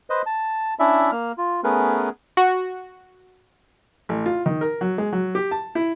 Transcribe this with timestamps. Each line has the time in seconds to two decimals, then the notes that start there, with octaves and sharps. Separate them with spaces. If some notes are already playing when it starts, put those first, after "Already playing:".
0.10 B4 C5 D#5
0.26 A5
0.79 C#4 D4 E4 D5 E5
1.12 A#3 F6
1.38 F4
1.64 A3 B3 C#4 G#4 A#4 B4
2.37 F#4
4.09 A1
4.26 F4
4.46 D#3
4.61 A#4
4.81 F#3
4.98 G#3
5.13 F#3
5.35 G4
5.51 A5
5.75 E4